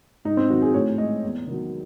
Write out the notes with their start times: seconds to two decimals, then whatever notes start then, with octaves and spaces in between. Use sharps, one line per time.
0.25 G#2 D#4
0.37 C4
0.50 D#3 F#3 F#4
0.62 G#4
0.74 A2 C#5
0.98 G#3 D#5
1.24 E2
1.47 D#3 F#3